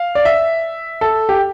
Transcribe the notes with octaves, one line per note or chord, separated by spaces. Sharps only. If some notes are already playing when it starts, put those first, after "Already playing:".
Already playing: F5
D5
E5
A4
G4